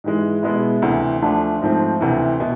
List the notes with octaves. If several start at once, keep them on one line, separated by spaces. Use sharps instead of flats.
G#2 E3 G#3
B2 G#3 B3 E4
D2 C3 E3
D2 D3 F3 A3 D4
G#2 F3 A3 C4
D2 C3 E3
B2